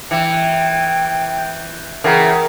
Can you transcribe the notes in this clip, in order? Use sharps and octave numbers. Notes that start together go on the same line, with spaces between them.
E3 G5 C#7
G6
C#3 E3 A#4 F#5 G5 A#5